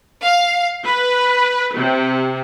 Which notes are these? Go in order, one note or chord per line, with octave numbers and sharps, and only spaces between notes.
F5
B4
C3